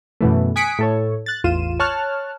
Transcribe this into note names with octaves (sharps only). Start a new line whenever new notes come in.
F#2 B2 E3 A3
G#5 D#6 F#6 B6 C#7 D7
A2 A4 C#5
F#6 A6
A1 E2 F4 D#7 E7
C#5 A5 C#6 F6 F#6